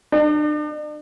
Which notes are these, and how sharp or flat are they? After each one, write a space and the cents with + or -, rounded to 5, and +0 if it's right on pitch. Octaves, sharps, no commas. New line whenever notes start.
D4 +40